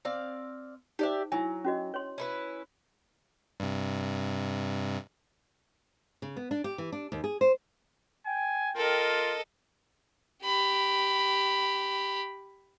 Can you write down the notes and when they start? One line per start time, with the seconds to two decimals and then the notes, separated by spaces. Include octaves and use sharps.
0.05 C4 D5 F5
0.99 D#4 G4 C5 D5 E5
1.32 F#3 E4 G#5
1.65 C#4 F#4 D#5
1.94 C#5 C6
2.18 C#4 E4 B4
3.60 G2 C3
6.22 C#3
6.36 B3
6.51 D4
6.64 G4
6.78 E3
6.92 D4
7.12 D#2
7.24 G#4
7.41 C5
8.26 G5 G#5
8.77 F4 A4 A#4 D#5
10.44 G4 B5